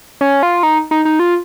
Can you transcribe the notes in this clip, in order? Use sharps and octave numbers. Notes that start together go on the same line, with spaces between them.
C#4
F4
D#4
D#4
D#4
F4